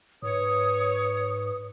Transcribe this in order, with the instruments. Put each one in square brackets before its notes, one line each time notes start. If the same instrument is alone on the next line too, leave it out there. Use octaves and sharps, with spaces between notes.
[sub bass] G#2 [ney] B4 [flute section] C#5 [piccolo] D#6